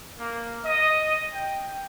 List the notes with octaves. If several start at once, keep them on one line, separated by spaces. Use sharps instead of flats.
A#3
D#5
G5